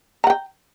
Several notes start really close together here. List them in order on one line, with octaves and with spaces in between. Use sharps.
A#5 F#5 G5